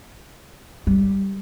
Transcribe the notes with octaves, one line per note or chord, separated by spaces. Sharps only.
G3